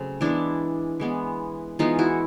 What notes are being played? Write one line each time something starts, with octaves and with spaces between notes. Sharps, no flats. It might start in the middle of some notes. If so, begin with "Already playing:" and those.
Already playing: C#3 F#3 A3 C4
E3 G#3 B3 D4 E4
E3 G#3 B3
E3 G#3 B3 D#4 F4
E4 F#4